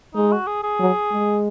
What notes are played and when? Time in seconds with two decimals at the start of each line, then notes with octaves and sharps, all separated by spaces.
0.14 G#3 D#4
0.32 F#4
0.47 G#4
0.63 G#4
0.80 F#3
1.12 G#3